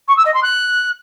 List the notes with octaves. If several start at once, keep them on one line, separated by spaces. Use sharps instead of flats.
C#6
E6
D#5
C6
F#6